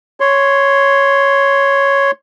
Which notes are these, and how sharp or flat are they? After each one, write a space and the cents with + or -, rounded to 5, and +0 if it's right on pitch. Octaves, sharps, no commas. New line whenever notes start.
C#5 +0 C6 +0